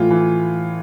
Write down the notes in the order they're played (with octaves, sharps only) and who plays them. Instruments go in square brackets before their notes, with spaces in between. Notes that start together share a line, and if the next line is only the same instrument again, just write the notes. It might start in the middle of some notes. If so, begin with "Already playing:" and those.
Already playing: [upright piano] A2 E3 F4
E3